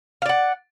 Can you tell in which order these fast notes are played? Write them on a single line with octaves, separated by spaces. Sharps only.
F5 D5 F#5